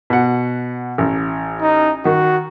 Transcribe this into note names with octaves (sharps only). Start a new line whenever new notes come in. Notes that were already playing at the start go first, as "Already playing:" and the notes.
B2 F#5
A1
D#4
D#3 F#4